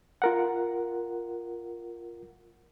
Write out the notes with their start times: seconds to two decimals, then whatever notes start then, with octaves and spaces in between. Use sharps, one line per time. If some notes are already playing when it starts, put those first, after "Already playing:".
0.22 F4 A#4 F#5